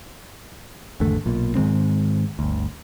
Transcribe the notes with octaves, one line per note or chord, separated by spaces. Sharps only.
G#1 E2 D3 A3
B1 A#2
G#2 D#3 G#3 C4
G1 D2